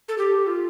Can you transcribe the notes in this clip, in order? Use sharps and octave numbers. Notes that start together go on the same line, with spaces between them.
A4
G4
F4